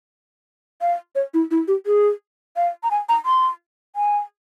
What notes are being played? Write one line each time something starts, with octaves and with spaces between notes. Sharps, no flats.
F5
C#5
E4
E4
G4
G#4
F5
A#5
G#5
A#5
C6
G#5